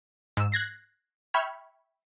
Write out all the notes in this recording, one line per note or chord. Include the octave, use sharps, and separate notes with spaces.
G#2 E6
F#6 G#6 A#6 C7
E5 G5 B5 C#6 F6 G#6